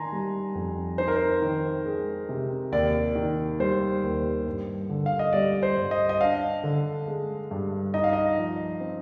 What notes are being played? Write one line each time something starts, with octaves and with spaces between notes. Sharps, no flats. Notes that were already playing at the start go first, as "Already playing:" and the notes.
Already playing: D#3 D4 G#5 A#5 C6
G3
F2
D#4 C5
A#4
C5
D#3
G#3
C3
D#2 D5
D#3
G3 C5
D#2
G2
D3
F5
D#5
G3 D5
C5
G2
D#5
D#5
D4 F5
D3
G#3
G2
D#4 D#5
F5
D#5
F3
C4